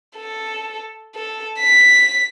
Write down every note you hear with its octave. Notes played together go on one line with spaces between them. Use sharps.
A4
A4
B6